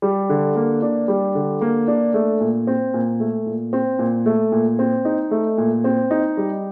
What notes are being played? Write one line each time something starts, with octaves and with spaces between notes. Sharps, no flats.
G3
D3
A#3
D4
G3
D3
A#3
D4
A3
A#2
C4
A#2
A3
A#2
C4
A#2
A3
A#2
C4
D#4
A3
A#2
C4
D#4
G3